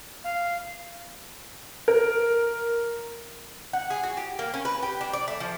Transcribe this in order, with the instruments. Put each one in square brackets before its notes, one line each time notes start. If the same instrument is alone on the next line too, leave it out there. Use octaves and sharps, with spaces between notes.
[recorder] F5
[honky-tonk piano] A#4
[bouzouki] F#5
G#4
F#4
G4
A#3
C#4
B4
G4
D4
D5
A3
F3